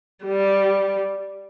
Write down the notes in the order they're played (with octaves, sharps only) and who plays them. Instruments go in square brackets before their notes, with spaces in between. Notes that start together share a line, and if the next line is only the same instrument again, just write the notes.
[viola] G3